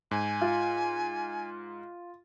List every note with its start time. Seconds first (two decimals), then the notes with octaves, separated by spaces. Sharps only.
0.11 G#2 G#5
0.41 F4